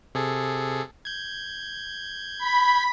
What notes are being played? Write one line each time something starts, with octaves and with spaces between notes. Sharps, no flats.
C3 G#4 A4
G6 G#6
B5